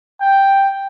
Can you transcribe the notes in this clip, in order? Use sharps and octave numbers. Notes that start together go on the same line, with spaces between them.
G5